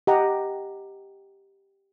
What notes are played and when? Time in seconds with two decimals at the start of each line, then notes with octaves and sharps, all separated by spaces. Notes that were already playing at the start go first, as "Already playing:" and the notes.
0.07 G4 D#5 F#5 A#5